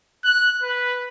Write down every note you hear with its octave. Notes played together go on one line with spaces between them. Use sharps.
F#6
B4